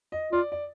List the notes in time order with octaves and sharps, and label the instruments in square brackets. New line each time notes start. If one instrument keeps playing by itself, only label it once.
[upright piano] D#5
[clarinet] F4 [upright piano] D5
[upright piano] D5